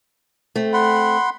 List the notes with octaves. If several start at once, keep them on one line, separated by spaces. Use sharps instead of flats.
A3 C4
F#5 B5 C6